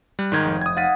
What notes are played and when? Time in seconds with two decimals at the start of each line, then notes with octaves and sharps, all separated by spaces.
0.19 G3 F#6
0.32 G#2 D#3 D#4 D#5 G5 G#6
0.45 F1
0.61 D#6 G#6
0.77 F5 F#5 A6 B6 D#7